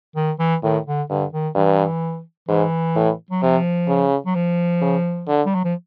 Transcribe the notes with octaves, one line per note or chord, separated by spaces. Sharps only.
D#3
E3
A2 D#3
D3
G2 D3
D#3
G2 E3
G#2 E3
A2
F#3
C3 F3
C#3
F#3
F3
C#3
D3
G3
F#3
F3